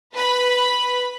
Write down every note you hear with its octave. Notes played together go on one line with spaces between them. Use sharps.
B4 B5